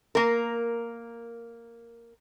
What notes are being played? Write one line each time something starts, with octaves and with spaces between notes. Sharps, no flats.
A#3 A#4